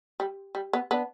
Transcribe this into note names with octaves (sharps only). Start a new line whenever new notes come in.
G3
G3
B3
B3 D4